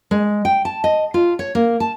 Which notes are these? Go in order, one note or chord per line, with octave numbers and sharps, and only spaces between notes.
G#3
G5
A5
D#5
F4
C#5
A#3
A5